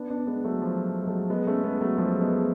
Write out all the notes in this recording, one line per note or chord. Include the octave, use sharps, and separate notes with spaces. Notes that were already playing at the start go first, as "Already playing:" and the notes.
Already playing: B3 D4
B3 D4
G#3 B3
F#3 A3
F3
G#3
F#3 A3
G#3 B3
A3 C#4
G#3 B3
F#3 A3
F3 G#3
G#3 B3